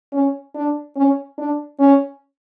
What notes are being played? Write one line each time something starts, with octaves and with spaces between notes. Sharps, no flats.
C#4
D4
C#4
D4
C#4